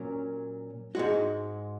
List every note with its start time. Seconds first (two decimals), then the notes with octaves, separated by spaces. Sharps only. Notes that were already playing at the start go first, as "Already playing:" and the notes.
Already playing: A#2 F#3 C#4 A#4
0.95 G#2 G#3 F#4